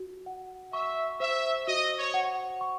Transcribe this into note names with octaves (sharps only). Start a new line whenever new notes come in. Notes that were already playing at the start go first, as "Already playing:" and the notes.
Already playing: F#4
F#5
E5 C#6
C5 E5
F#4 D#5
C#5
F#5
C#6